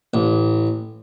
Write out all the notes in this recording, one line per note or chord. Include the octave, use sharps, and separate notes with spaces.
A1